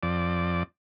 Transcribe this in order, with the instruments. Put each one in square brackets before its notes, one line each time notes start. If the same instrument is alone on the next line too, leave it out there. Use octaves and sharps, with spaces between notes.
[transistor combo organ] F2 D5